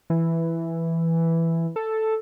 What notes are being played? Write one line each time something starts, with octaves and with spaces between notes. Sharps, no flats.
E3
A4